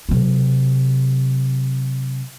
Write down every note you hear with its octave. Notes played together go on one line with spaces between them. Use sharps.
C3 F#3